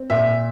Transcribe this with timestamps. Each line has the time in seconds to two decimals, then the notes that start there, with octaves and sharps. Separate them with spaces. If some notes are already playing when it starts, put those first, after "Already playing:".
Already playing: C4
0.10 A#2 E5